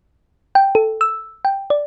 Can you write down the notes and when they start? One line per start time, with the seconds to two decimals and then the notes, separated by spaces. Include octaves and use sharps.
0.55 G5
0.75 A4
1.01 E6
1.45 G5
1.70 D5